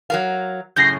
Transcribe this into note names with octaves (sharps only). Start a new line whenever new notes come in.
F#3 A#4 F5
F#2 A2 C#3 G6 A#6 C7